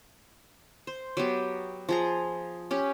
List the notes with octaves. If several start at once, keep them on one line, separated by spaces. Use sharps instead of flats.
C5
F#3 B3 G4
F3 G#4 A#5
C#4 G4